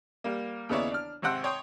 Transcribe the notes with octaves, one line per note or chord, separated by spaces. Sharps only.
G3 A#3
D#2 C#3 B3 E4 C#5 D5
D4 F6
G#1 C3 C4 F#5 C6 E6
C#5 G5 C6 D#6